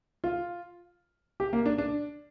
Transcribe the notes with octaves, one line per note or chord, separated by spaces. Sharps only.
F4
G4
A#3
D4
D4